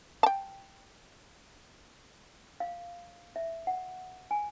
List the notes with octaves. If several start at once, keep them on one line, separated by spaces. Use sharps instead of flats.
G5 A5
F5
E5
F#5
G#5